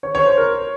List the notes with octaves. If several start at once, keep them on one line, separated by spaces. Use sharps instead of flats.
C#5
C#5
C5
A#4